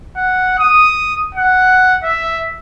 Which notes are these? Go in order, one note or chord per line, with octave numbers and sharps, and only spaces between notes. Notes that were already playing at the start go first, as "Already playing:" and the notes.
F#5
D#6
F#5
E5